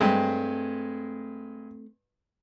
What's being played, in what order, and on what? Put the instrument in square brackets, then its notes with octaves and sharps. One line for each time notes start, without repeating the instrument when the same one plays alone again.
[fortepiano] G2 G#3 [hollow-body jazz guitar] A3 C4